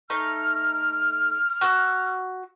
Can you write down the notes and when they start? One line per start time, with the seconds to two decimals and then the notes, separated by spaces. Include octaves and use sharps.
0.10 A3 D#4 F6
1.61 F#4 E6